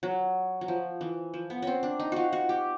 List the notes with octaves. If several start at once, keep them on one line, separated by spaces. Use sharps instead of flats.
F#3
F#3
F3
E3
F3
B3
C4 C#4
D4
D#4
F4 F#4
F#4
G4